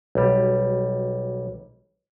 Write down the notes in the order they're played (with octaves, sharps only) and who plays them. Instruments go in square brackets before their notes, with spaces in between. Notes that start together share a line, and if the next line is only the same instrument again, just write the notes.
[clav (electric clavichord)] B1 G3